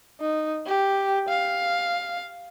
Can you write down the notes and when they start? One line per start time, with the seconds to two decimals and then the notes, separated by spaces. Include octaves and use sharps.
0.21 D#4
0.67 G4
1.29 F5